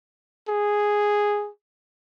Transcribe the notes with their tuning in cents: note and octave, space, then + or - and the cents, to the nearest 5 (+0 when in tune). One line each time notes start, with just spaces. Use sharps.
G#4 -5